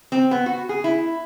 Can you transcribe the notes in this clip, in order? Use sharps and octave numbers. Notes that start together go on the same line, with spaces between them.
C4
B3
F#4
G#4
E4